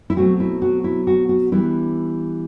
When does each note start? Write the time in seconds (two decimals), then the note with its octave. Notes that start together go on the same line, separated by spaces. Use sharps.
0.10 E4
0.16 B2 F#3 A3 C4 F#4
0.40 E4
0.62 F#4
0.84 E4
1.07 F#4
1.29 F#4
1.52 E3 G3 B3 D4 E4